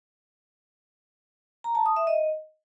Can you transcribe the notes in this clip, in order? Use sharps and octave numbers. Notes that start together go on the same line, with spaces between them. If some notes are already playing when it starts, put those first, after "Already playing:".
A#5
A5
D#6
E5
D#5